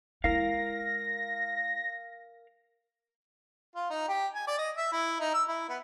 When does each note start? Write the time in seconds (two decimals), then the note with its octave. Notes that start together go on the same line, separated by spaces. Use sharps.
0.24 G#3 E4 A#4 F5 A#6
3.75 F4
3.90 D#4
4.08 G4
4.34 G#5
4.47 D5
4.59 D#5
4.77 E5
4.92 E4
5.20 D#4
5.34 E6
5.48 E4
5.69 B3